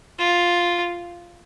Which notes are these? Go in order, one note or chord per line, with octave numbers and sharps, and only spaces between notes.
F4